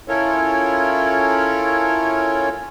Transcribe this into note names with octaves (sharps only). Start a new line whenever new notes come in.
C#4 E4 F4 A4 A#4 C#5